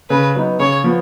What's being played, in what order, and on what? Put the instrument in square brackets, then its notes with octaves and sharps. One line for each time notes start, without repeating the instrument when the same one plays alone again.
[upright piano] C#3 [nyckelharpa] B4
[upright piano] F#3 B3 D#4
[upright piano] C#3 [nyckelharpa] C#5
[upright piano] F3 B3